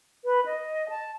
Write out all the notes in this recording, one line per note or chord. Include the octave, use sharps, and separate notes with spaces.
B4
D#5
A5